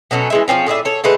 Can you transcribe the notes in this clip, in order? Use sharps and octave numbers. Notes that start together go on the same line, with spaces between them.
B2 F#3 A3 C#4
E3 G#3 E5
F3 F#3 C4 C#4
A2 G#4 D5 E5
A4 C#5
D3 G#3 A3 B4